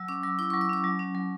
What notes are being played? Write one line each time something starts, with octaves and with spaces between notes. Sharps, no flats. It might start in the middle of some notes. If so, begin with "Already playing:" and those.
Already playing: F#3 E6
C#4 D6
F#3 E6
E4 D6
C#6
F#3
E6
C#4 D6
F#3
C#4
F#3